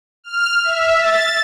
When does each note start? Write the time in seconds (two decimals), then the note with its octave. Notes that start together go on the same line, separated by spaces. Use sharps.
0.24 F6
0.64 E5
0.97 A6